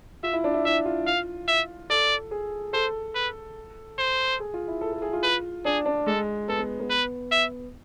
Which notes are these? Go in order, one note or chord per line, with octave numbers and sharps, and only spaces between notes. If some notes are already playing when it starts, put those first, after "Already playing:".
F4 E5
E4
D4
E4
E4 E5
F4
F5
E5
A4 D5
G#4
A4 C5
B4
C5
G#4
F4
E4
A4
A4
G#4
F4
B4
D4 G#4
D4
G#3 A4
B3 A4
B3
B3
B4
E5